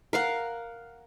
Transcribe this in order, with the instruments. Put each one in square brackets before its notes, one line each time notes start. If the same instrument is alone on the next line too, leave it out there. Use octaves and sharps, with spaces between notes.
[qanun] A#4 F5 F#5